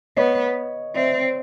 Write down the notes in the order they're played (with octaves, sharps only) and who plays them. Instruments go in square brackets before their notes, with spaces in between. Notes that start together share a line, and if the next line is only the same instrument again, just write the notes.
[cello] B3 [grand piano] C#5 D#5
[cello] C4 [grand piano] D5 E5